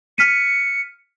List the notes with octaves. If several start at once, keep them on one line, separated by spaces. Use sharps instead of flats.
F6 B6 C#7 D#7